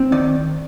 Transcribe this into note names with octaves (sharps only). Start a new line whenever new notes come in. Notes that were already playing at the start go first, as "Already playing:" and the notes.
Already playing: C4
D#3 D5